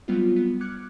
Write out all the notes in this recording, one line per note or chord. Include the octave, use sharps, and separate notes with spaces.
F#3 G3 B3 C4 F4
B3
D6 F6 F#6 G#6 C#7